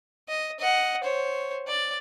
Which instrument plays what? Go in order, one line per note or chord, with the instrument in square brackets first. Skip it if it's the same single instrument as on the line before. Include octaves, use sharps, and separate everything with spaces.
[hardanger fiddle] D#5
D#5 F#5
C5 C#5
D5